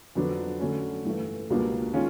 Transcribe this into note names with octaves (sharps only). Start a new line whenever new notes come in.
F2 D3 F#3 B3 D4
D3 F#3 A3 C#4
G2 E3 A3
C#2 B2 G3 A#3 D4
D#3 G#3 C#4 F4